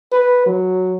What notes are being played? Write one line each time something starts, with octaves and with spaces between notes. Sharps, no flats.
B4
F#3